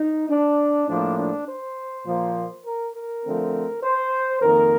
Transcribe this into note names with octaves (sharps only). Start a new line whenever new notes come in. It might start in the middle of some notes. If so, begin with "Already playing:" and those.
Already playing: D#4
D4
A2 F3 A#3 D4
D4
C5
A#2 F3 A#3
A#4
A#4
D3 F3 A3 C4
C5
F2 D#3 A#3 A#4